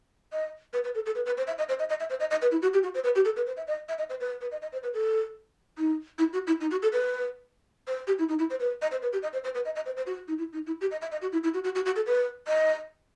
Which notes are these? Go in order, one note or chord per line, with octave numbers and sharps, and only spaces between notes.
D#5
B4
B4
A4
A4
B4
B4
C5
E5
D#5
C5
D#5
D#5
E5
C5
D#5
D#5
B4
E4
F#4
G4
F#4
C5
B4
G4
A4
B4
C5
E5
D#5
E5
D#5
C5
B4
B4
D#5
D#5
C5
B4
A4
D#4
E4
F#4
E4
D#4
F#4
A4
B4
C5
G4
E4
D#4
E4
C5
B4
D#5
C5
B4
G4
D#5
C5
C5
B4
D#5
D#5
C5
C5
F#4
D#4
E4
D#4
E4
G4
D#5
E5
D#5
F#4
E4
E4
F#4
F#4
F#4
F#4
A4
B4
D#5